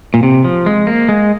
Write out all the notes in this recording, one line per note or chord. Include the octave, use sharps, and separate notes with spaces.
A#2
C3
F3
G#3
A#3
G#3